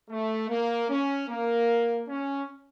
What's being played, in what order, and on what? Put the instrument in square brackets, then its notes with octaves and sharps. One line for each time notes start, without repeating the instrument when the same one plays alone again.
[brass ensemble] A3
A#3
C#4
A#3
C#4